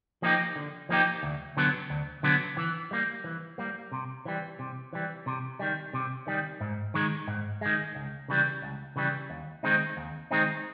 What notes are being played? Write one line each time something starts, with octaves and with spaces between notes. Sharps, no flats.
F3 A#3 D#4 G4
D3
F3 A#3 D#4 G4
D2
D3 F#3 B3
D2
D3 F#3 B3
E3
G3 A#3
E3
G3 A#3
C3
E3 G3
C3
E3 G3
C3
D#3 G3
C3
D#3 G3
G#2
D#3 G#3
G#2
D#3 G#3
C#2
C#3 E3 G3
C#2
C#3 E3 G3
D#2
D#3 G#3 C4 D#4
D#2
D#3 G#3 C4 D#4